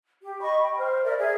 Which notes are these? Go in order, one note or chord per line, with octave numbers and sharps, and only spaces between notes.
G4
D#5 B5 C#6
G5
C5 F6
A#4 D5 E5
G#4 E5